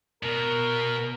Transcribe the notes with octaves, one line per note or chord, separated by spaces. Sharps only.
B2 A#4